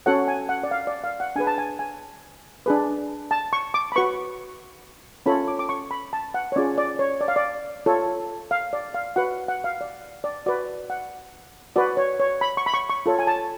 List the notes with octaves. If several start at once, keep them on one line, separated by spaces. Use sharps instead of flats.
C#4 F#4 A4 C#5 F#5
G#5
F#5
D5
F5
D5
F5
F#5
D4 G#4 B4 G#5
A5
G#5
G#5
D4 G#4 B4
A5
C#6
D6
B5
F#4 B4 C#6
C#4 F4 A4 C#5 B5
D6
D6
C#6
B5
A5
F#5
C#5
C#4 F4 G#4 D5
D5
C#5
D5
F5
D5
F4 A4 C#5
F5
D5
F5
F#4 B4 F#5
F#5
F5
D5
D5
F#4 B4 D5
F#5
F#4 B4 D5
C#5
C#5
B5
C#6
B5
C#6
C#6
F4 A4 C#5
G#5
A5